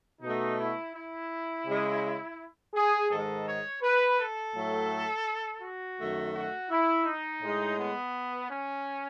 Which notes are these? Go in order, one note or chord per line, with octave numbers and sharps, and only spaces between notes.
B2 A3 D#4
E4
E4
C#3 G#3
G#4
G#2 D#3 G#3 A4
C#5
B4
A4
A2 F#3 A3
F#4
F#2 D#3 A3
F#4
E4
D#4
A2 G#3
B3
C#4